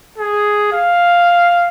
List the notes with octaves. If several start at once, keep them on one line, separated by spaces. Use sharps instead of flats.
G#4
F5